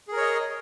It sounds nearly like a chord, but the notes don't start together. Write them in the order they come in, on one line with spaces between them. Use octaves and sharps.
G#4 A#4 C#5 D#5